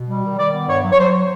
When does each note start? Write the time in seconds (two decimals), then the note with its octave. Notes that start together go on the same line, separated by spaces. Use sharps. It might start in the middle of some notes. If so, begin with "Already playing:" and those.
Already playing: B2
0.08 G3
0.23 D#3
0.38 D#3 D5
0.54 B3
0.68 G2 C#5
0.84 F#3
0.92 C#5
0.99 F#3 C5